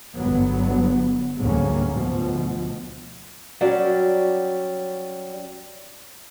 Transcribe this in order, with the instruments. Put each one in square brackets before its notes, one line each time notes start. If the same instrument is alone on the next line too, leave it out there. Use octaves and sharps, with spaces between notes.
[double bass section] G1 G2 D3 F#3 B3
D2 G#2 F#3 G3 A#3 C#4
D2 B2 F3
[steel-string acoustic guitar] F#3 G3 C#4 D5